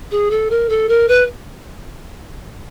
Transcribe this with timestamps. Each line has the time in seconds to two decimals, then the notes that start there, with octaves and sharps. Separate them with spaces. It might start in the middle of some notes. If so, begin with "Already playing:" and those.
0.11 G#4
0.31 A4
0.50 A#4
0.69 A4
0.89 A#4
1.09 B4